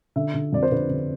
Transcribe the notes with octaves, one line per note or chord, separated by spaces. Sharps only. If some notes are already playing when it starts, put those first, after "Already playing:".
D3 E5
D3
F2 D5
C5
D3 B4
D3